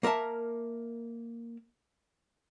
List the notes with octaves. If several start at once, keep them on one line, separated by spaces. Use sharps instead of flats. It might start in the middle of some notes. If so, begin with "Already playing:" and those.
A#3 A#4 E5 A5